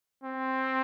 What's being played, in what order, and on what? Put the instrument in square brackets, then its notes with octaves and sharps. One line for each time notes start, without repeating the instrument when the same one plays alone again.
[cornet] C4